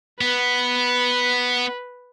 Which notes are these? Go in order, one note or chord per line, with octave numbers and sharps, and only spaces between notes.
B3 B4